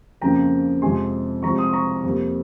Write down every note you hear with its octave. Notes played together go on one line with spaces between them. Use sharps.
F2 C#3 F3 A#3 G5 A#5
F2 C3 F3 G#3 G#5 C6
C2 C3 F3 G#3 A#5 C#6
C6 D#6
A#5 C#6
F2 C3 G3 A#3